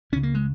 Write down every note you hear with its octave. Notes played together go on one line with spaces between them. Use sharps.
C#2 C#3 C#4
A#3
G#3